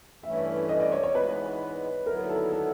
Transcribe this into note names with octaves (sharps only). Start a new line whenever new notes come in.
G2 E3 A3 C#4 E4 E5
D#5
D5
C#5
C#5
G#2 E3 G#3 B3 B4
D#2 D3 F#3 B3 E4 A#4
A4
A4